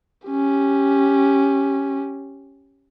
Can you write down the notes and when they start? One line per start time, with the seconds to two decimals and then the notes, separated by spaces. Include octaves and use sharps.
0.28 C#4 G4